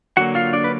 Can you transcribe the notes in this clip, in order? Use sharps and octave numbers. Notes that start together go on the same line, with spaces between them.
D3 F#3 A#3 F#4 F#5
F4 F5
D4 D5
B4